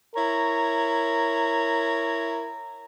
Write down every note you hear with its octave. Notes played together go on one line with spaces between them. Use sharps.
E4 A#4 C#5 A#5